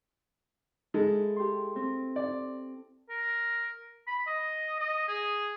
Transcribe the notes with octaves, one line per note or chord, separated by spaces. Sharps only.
G#3 E4 A4
G4 C6
C4
D5
A#4
B5
D#5
D#5
G#4